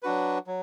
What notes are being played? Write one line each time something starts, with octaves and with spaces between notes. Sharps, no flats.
F#3 D4 F#4 B4
F#3